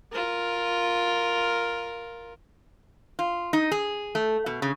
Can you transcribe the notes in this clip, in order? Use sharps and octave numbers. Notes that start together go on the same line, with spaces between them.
F4 A#4
F4
D#4
G#4
A3
B2
C#3